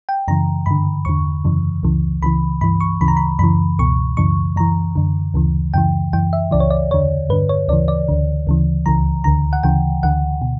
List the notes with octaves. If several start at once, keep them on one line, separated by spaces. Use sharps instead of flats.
G5
F#2 C#3 E3 A#5
G2 D3 B5
E2 D3 C#6
F#2 C#3 E3
C#2 C#3 E3
C#2 C#3 E3 B5
G2 E3 B5
C#6
D2 C#3 E3 B5
A#5
B5
F#2 C#3 E3 B5
C#2 B2 C#6
F#2 C#3 E3 C#6
F#2 E3 A#5
F#2 D3
D2 C#3 E3
F#2 C#3 E3 G5
F#2 E3 G5
E5
C#2 C#3 E3 D5
C#5
D5
E2 D3 C#5
G2 D3 B4
C#5
D2 C#3 E3 D5
D5
D2 D3
D2 C#3 E3
C#2 C#3 E3 A#5
D2 D3 A#5
F#5
D2 C#3 E3 G5
D2 D3 F#5
B2